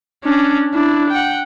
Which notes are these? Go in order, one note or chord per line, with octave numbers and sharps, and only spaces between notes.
C#4 D4
D4 E4
F#5 G5